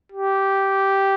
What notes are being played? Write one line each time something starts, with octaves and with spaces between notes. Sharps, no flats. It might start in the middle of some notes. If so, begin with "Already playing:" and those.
G4